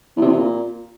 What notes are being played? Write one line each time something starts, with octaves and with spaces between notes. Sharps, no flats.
E2
C3
E2
C3
A#2